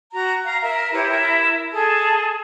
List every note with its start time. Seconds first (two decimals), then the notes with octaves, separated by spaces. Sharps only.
0.12 F#4 A#5
0.44 F5 A#5
0.61 A#4 E5
0.93 E4 G4 B4 C#5
1.08 E4 A#4 E5
1.72 G#4 A4 A5